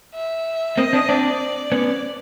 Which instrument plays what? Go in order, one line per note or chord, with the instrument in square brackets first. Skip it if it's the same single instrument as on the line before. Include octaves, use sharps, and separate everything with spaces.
[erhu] E5
[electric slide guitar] A#3 C4 [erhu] D#5
[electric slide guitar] C4 D4
[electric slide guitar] C4 D4 [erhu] D5
[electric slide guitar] B3 C#4